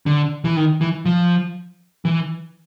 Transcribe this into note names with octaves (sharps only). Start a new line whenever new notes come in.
D3
E3
D#3
E3
F3
E3